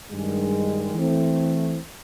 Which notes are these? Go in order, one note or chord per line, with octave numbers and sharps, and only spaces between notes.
G2 D#3 G#3
E3 A3 C4